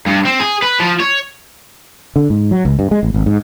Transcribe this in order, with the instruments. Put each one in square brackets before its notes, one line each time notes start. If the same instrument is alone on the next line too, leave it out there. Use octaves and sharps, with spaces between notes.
[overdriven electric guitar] G2
C4
G#4
B4
F3
C#5
[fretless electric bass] D3
G#2
F#3
C#2
G2
G#3
A1
G#1
G#2